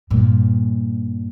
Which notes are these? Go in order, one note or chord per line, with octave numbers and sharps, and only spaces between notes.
G2 A#2